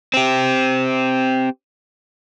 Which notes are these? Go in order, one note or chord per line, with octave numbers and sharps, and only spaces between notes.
C4 G4